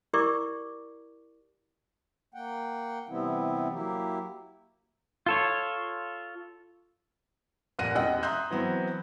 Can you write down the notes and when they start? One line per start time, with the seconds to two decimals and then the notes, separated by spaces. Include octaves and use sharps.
0.13 E4 G4 A#4 D5 C#6 D6
2.34 A#3 F#5 G5
3.09 C3 E3 G3 B3 C4 E4
3.71 F#3 A#3 E4 G4
5.26 F4 A4 C#5
7.79 F1 A#2 F#5 F#6 A#6 D#7
7.95 E1 A1 D#5 F#5 G5 E6
8.23 E5 A#5 C6 D#6 F#6 G6
8.51 E3 F#3 B3 C4